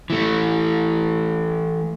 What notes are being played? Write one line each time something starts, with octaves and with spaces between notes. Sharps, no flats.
E3 A3